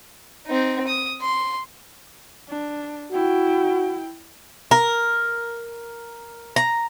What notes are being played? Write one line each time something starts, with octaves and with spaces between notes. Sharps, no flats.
C4 D#4
D#6
C6
D4
E4 F#4 G5
A#4
A#5